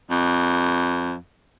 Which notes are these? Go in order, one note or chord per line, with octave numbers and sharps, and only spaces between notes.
F2